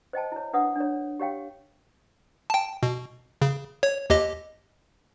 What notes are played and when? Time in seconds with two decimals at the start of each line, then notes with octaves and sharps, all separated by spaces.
0.13 C5 D#5 G5 A5
0.32 E4 C#5
0.53 D4 B4 E5 F#5 D#6
0.76 D4 C#5
1.20 G4 C#5 F5 G5
2.50 G5 A5
2.83 B2
3.42 C#3
3.83 C#5
4.10 D#2 G4 D#5